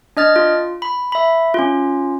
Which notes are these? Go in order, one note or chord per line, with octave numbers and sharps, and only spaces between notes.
D4 D#5 F6 A6
F4
B5
E5 B5
C#4 F4